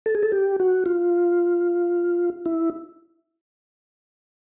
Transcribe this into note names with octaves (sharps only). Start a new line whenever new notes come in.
A4
G#4
A4
G4
F#4
F4
E4